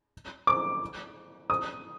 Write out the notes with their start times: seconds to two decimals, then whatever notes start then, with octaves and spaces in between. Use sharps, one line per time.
0.47 D6
1.50 D#6